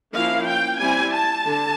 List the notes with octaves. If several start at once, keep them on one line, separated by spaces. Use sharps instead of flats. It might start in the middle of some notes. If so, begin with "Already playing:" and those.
F3 A#3 C#4 E4 F5
G5
G3 C4 E4 G#5
A5
D3